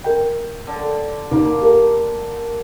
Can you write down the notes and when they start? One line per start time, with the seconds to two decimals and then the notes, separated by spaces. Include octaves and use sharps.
0.04 A#4 G5
0.67 D3
1.31 D#2 A#3
1.61 G4 A4 A#4